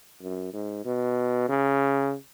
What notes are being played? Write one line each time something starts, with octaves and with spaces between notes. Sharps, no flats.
F#2
G#2
B2
C#3